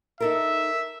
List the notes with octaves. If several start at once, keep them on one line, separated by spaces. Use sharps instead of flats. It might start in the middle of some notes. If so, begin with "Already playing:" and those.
D#4 A4 A#4 E5